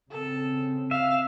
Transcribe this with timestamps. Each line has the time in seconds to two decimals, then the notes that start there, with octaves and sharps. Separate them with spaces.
0.11 C#3 C4 A4
0.91 E5 F5